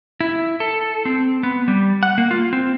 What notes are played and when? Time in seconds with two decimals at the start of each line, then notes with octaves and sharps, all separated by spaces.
0.21 E4
0.60 A4
1.05 C4
1.43 B3
1.68 G3
2.03 F#5
2.18 A#3
2.31 F4
2.53 C4